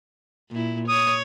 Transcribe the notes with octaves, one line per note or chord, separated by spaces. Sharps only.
A#2 E4
C#5 D#6